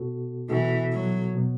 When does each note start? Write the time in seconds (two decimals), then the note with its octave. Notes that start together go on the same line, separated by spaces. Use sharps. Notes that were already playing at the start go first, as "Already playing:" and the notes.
Already playing: B2 B3 F#4 A4
0.49 B2 E3 B3 F#4 A4
0.93 F#3
1.34 B2 F#3 B3